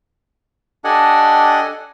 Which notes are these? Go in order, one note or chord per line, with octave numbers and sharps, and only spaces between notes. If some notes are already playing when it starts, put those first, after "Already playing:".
D4 G4 A4 D#5 F#5 G#5